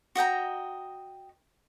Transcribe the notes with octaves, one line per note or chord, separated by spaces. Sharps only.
F#4 D#5 G5 A#5